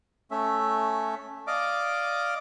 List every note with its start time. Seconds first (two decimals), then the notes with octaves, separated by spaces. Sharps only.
0.31 A3 C#4 E5
1.47 D5 D#5 F5 D6